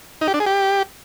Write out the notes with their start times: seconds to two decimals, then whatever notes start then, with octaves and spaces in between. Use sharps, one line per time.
0.21 D#4
0.28 G4
0.34 D4
0.40 G#4
0.46 G4